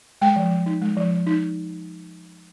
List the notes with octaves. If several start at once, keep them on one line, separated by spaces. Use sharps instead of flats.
G#3 G5
F3
F3
D#4
G#3
F3
F3
D#4